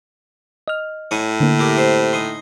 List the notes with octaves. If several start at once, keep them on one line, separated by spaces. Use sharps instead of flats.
D#5 F6
A2 C#5 G#5
D3 A#3
E4 G4 A#4
C3 C5
D#4 G#5 C6